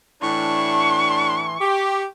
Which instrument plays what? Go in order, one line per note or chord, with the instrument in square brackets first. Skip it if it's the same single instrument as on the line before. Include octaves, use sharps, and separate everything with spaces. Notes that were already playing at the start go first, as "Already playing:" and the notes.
[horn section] A2 E3 D4 [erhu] C#6
[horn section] G4